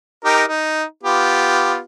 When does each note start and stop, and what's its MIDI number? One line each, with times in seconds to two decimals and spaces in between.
0.25 0.43 63
0.25 0.43 67
0.25 0.43 70
0.48 0.84 63
1.03 1.80 59
1.03 1.80 65
1.03 1.80 67